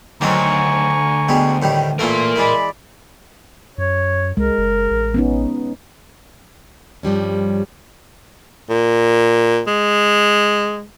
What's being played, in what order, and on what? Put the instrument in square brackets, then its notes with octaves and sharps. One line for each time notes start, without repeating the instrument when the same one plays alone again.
[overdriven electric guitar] D2 [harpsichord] D#3 F#3 C4 [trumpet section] G#5 A#5 C#6
[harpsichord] B2 G3 G#3
A2 D#3 G3
[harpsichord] A#2 E3 A3 [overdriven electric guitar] A#4 C6
[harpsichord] E3 G#3 [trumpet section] D5 B5
[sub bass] F#2 [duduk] C#5
[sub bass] C2 [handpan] G#3 [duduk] A#4
[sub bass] F#1
A1
[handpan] B3 C#4 D#4
[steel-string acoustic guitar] G2 F3 G3 C#4
[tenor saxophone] A#2
G#3